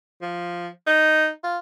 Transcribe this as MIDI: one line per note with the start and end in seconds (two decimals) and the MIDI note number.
0.22 0.68 53
0.87 1.30 63
1.44 1.58 65